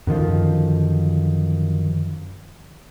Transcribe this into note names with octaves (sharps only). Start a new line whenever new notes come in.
F#2 D3 D#3 F3